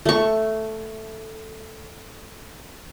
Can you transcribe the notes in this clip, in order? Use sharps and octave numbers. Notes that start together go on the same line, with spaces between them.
A3 C#6